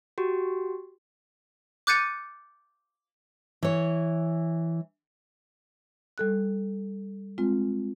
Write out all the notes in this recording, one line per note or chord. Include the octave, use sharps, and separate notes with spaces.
F#4 G4
D6 F#6 G6 A6 C#7 D#7
E3 C#5
G3 A4 F#6
G#3 C4 F4